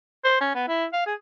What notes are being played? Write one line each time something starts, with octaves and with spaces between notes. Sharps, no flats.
C5
C#4
B3
E4
F5
G#4